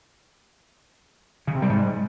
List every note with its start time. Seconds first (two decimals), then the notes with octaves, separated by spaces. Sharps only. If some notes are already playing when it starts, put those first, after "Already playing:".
1.47 C#3
1.55 C3
1.62 G3
1.69 G#2